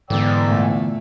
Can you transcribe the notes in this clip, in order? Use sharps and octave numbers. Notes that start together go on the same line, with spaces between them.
G#2 D3 E3 B3 D5 G5 E6
A#2 A3